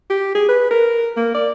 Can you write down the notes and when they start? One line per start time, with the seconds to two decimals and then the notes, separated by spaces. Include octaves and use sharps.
0.10 G4
0.35 G#4
0.49 B4
0.71 A#4
1.17 A#3
1.34 D5